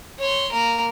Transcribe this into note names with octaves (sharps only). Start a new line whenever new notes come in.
C#5 C6
A#3 A#4